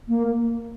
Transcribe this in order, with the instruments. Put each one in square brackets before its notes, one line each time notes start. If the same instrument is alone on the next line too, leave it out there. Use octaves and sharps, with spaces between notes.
[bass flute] A#3